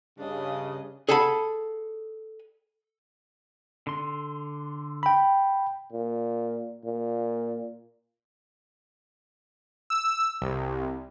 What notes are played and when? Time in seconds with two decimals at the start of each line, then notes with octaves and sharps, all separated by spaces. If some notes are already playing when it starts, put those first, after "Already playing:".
0.18 G2 C#3 D4 D#5
1.09 G#4 A4 F#5 A5 B5
3.87 D3 C6
5.03 G5 B5
5.92 A#2
6.84 A#2
9.90 E6
10.42 C2